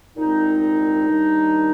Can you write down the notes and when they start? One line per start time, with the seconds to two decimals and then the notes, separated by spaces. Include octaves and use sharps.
0.17 C2 A#2 G#3 C4 D#4
1.09 D#2 D#3 G3 D4